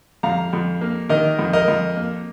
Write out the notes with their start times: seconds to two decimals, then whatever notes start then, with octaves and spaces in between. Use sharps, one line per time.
0.23 F2 F5 A#5
0.53 F2
0.81 A#3
1.09 D#3 A#4 D#5
1.39 F2
1.53 A#4 D#5
1.68 F2
1.97 A#3